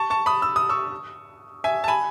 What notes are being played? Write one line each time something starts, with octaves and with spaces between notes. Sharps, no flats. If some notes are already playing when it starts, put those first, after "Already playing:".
Already playing: A5 C#6
A5 C#6
B5 D#6
E6
D#6
C#6 E6
E5 G#5
A5
G#5 B5